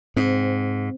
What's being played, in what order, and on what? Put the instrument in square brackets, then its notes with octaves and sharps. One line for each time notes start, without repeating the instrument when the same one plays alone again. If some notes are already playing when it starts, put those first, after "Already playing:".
[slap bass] G#2 [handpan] C4